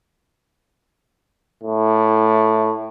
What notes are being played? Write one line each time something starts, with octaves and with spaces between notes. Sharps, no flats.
A2